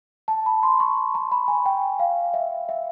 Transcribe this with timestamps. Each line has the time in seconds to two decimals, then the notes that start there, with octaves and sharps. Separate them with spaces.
0.28 A5
0.46 B5
0.63 C6
0.80 C#6
1.15 A#5
1.32 B5
1.48 G#5
1.66 G5
1.99 F5
2.34 E5
2.69 E5